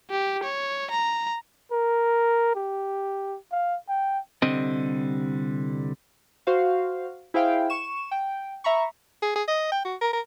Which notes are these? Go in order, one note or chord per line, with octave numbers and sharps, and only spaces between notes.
G4
C#5
A#5
A#4
G4
F5
G5
C2 D3 G3 C4 D#5
F#4 C5 F5
E4 G#4 C5 E5 F5 G5
C#6 E7
G5
E5 A#5 B5 C#6
G#4
G#4
D#5
G5
F#4
A#4
A#4